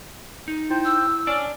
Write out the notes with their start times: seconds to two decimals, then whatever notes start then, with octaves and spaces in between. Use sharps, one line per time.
0.48 D#4
0.70 E4 C5 G5
0.85 E6
1.27 C#4 D4 D5